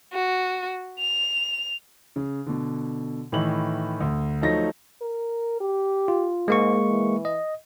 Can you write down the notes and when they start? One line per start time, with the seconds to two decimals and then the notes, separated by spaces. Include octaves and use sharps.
0.13 F#4
0.99 F7
2.16 C#3
2.46 B2 D3
3.32 A2 D#3 E3 D#5 F#7
4.01 D2
4.42 F3 F#3 A3 D#4 A#6
5.01 A#4
5.60 G4
6.08 F4
6.48 G#2 G#3 A#3 C#6
6.90 E3
7.25 D#5